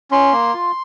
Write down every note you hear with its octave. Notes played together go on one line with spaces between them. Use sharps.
C#4 C6
A#3
F4